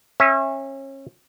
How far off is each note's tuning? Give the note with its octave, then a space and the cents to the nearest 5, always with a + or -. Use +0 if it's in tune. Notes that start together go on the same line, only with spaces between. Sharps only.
C#4 -30 E5 +0